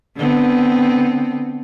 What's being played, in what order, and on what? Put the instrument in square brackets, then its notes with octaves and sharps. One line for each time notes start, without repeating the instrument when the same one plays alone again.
[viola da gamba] D3 B3 C4